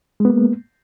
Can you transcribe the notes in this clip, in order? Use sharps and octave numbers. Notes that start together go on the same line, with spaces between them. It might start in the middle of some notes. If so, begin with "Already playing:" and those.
G#3 A#3 B3